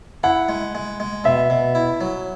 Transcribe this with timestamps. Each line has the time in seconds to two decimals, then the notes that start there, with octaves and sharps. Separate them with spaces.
0.23 E4 F#5
0.49 G#3
0.75 G#3
1.00 G#3
1.24 B2 E5
1.50 B2
1.75 E4
2.01 F#3